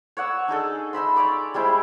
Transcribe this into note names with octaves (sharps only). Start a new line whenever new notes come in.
C#5 D5 F#5 E6
D4 D#4 G#4 A4
D#4 E5 B5 C6
C#5 D5 D6
G3 G#3 E4 C5